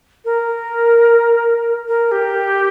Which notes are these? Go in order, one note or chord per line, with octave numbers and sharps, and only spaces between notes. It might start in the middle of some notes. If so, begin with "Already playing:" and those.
A#4
A#4
G4